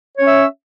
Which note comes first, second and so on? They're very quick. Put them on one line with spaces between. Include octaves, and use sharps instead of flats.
C#5 C#4 E5